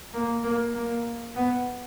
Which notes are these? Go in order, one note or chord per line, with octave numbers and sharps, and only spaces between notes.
A#3
A#3
A#3
B3